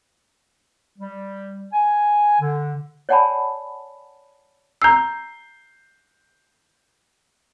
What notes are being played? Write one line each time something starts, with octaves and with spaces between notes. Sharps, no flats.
G3
G#5
D3
C#5 D5 F#5 G#5 A5 B5
A#5 E6 G6 C7